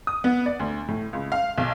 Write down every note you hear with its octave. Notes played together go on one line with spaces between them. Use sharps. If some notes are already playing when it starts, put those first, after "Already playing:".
D#6
B3
D5
D2
A2
C#2
F5
B1